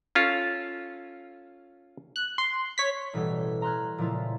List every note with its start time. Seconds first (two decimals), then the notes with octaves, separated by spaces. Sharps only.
0.15 C#4 F4 A4
2.16 F#6
2.38 C6
2.78 C#5 B6
3.14 A1 B2 G3 A4
3.62 A#5 C6 F6 F#6 G#6
3.98 A#2 C#3 F3 G#3 E4 F4